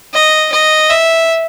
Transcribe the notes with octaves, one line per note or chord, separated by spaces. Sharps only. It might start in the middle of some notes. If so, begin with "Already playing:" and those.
D#5
D#5
E5